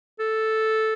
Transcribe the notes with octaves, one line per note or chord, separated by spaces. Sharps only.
A4